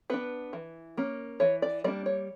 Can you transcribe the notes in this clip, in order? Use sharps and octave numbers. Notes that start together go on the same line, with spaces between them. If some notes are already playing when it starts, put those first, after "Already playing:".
B3 D4 B4
E3
A#3 C#4
E3 C#5
D5
G3 A#3 D4 D5
C#5